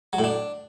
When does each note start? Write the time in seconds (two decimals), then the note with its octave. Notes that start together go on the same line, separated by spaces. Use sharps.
0.13 F#3
0.19 A2
0.24 D4